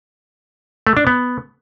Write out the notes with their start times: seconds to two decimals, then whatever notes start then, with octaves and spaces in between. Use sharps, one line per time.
0.87 A3
0.97 D4
1.07 B3